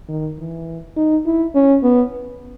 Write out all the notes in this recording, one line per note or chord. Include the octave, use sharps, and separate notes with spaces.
D#3
E3
D#4
E4
C#4
B3